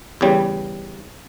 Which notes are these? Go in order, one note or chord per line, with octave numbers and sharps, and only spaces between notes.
E2 C#3 G3